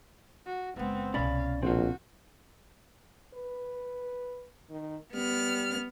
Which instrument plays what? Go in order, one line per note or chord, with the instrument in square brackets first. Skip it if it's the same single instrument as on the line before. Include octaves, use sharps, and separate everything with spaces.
[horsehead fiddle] F#4
[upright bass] F#1 G#3 [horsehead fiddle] B3 C4
[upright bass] C2 B2 [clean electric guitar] C#4 D5 B5 [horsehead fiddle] F5
[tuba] A#1 [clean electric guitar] C4 F4 [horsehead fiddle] F#4
[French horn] B4
D#3
[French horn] G3 [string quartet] B3 F6